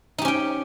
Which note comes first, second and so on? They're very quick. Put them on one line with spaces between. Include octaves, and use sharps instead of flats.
D#4 G4 C#4 G5